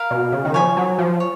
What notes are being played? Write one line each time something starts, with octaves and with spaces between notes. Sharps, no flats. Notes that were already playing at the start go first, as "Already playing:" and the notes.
Already playing: A#4 F5 B5
B2
C#3
D#3
F3 C#5 G#5 B5
F#3
F3
C#5